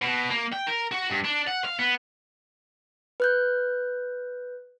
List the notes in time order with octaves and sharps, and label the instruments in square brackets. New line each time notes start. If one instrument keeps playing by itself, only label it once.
[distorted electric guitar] B2
A#3
G5
A#4
F#4
G2
D4
F#5
F5
B3
[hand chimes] B4 F#6 G6